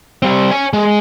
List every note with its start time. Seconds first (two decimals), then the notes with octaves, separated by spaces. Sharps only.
0.22 G3 C4
0.52 C#5 G#5
0.73 G#3